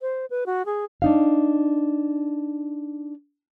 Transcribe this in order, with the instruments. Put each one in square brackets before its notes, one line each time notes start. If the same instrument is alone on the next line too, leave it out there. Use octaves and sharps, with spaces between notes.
[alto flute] C5
B4
F#4
G#4
[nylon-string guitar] D4 D#4 F5